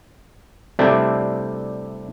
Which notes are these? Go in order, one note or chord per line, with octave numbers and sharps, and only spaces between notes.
C3 G3 A3 C4 D4 E4